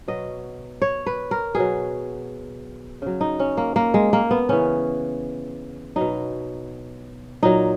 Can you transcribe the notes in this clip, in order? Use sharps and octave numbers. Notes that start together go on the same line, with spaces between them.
B2 F#3 D#5
C#5
B4
A#4
B2 F#3 G#4
C#3 F#3
D#4
C#4
A#3
A#3
G#3
A#3
B3
C#3 E3 C#4
B2 F#3 D#4
A#2 F#3 D#4